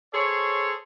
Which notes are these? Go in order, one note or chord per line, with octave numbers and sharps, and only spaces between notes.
G#4 A4 C5 C#5